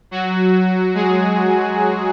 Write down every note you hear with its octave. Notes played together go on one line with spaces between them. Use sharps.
F#3 F#4
G#3 G#4